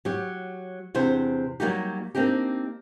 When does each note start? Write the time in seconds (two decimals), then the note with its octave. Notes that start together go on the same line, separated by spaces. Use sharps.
0.05 F#3 G4
0.95 E2 C3 D4 C5
1.60 F#3 G3 A#3 D#4 F#4 G4
2.15 A#3 C4 D4 D#4 G4